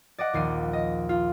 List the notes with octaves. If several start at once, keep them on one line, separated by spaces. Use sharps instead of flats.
D5 D#5 F#5
A#1 D#2 C7 D#7
D#5
F4